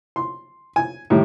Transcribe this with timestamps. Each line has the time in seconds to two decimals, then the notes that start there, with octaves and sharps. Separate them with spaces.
0.16 C6
0.76 G#5
1.10 A2 D#3 G3